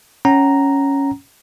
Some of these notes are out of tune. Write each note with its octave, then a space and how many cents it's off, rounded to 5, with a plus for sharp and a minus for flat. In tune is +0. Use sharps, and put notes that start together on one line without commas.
C#4 +0 F#5 +30 A#5 +0